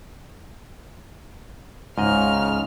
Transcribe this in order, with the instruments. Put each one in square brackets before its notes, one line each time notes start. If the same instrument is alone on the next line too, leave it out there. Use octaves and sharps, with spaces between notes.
[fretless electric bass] C#2 [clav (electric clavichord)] G#2 D#5 [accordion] C#3 [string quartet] F6